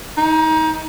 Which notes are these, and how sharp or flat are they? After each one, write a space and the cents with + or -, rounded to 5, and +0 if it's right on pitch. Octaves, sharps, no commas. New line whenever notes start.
D#4 +25